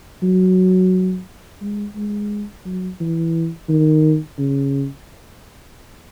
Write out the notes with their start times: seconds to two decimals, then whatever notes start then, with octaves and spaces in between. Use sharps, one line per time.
0.22 F#3
1.61 G#3
1.96 G#3
2.66 F#3
3.00 E3
3.69 D#3
4.38 C#3